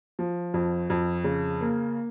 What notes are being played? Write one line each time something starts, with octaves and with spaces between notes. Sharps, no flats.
F3
F2
F2
C#3
A#3